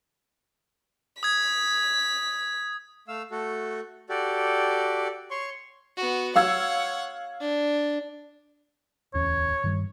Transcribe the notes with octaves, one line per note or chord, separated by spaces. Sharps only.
D#6 G#6 B6
A3 F5 E6
A3 F#4 A4
F#4 G4 A4 D5
C#5 C6 C#6
B3 F#4
C#5 F5 F#5 E6 G#6
D4
D1 E2 C#4 C#5
G2 D#3 G3